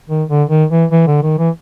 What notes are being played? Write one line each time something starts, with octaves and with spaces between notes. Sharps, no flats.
D#3
D3
D#3
E3
E3
D3
D#3
E3